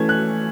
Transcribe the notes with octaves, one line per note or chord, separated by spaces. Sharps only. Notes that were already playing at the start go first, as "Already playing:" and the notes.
Already playing: E3 A3 C#4 G#6
F#6